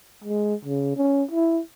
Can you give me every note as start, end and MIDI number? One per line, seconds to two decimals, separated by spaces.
0.24 0.55 56
0.65 0.97 49
0.97 1.23 61
1.32 1.60 64